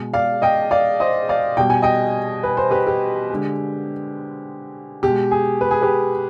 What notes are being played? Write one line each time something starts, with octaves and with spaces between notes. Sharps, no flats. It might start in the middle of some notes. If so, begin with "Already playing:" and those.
Already playing: B2 G#3
D5 F5
D#5 G5
D5 F5
C5 D#5
D5 F5
B2 G3 G5
G#5
D#5 G5
B4
C5
G4 B4
G4
D3 G#3
B2 G#3 G4
G#4
B4
G#4
G4 B4